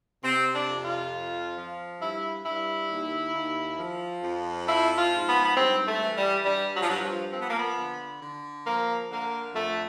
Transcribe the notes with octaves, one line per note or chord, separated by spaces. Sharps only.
C3 C4
D4
F2
F4
F3
F3
G2 E4
G2 E4
D#2
D#2
F3
F2
F3 E4
F4
G#2
B3
B3
G2 C4
A3
E3
G3
G2 G3
F#3
F3
G2 F#3
F3
F3 C4
B3
A#3
B3
D3
D3
F3 A#3
D3 A#3
F2 A3